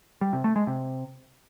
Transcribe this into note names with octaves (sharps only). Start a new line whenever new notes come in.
G3
C3
A3
G#3
C3